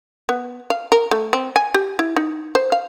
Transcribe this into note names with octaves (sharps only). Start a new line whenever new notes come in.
B3
F5
A#4
A3
C4
G#5
G4
E4
D#4
C5
F5